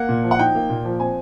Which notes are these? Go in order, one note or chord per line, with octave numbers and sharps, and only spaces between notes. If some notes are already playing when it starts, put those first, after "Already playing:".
Already playing: A#3 F#5
A#2
F3
F#5
D#4 G5
A#3
A#2
F3
C4 G#5